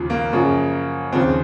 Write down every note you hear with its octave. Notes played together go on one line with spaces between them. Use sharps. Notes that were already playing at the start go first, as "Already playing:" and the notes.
Already playing: D#2 C#3 F3
A#3
F#2 C#3 F3
D#2 C#3 F3 C4